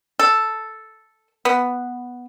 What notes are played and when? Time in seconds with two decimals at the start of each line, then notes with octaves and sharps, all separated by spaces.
0.19 A4
1.45 B3